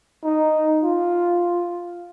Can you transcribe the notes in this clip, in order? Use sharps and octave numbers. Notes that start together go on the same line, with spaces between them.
D#4
F4